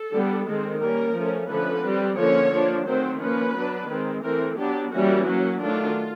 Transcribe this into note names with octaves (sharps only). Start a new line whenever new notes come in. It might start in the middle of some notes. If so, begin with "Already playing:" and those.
Already playing: A4
D3 G3 B3 D4
D#3 G#3 C4
G3 A#3 C#4 A#4
F3 A3 C#4
D3 F3 A3 C#4 B4
G3 C4
D3 F3 A#3 C#4 C#5
F3 A#3 D4
D#3 F#3 A3 C4 C5
F3 A#3 C#4 B4
F#3 B3 D4
D#3 G#3 C4
E3 A3 C4 A#4
F#3 B3 D4 G4
E3 G3 A#3 C#4 F#4
F#3 A#3 C#4
D#3 F#3 A3 D4 F4